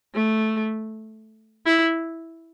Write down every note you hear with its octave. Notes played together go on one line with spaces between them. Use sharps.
A3
E4